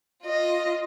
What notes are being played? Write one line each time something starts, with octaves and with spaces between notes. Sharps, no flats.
F4 D#5